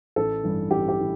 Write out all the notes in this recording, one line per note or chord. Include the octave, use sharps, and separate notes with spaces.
A1 A4
G2 E3
A1 G4
G4
E3